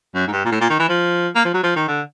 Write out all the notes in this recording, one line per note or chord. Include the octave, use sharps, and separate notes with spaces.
F#2
G#2
G2
A#2
A2
A#2
D#3
E3
F3
A#3
F3
F#3
F3
D#3
D3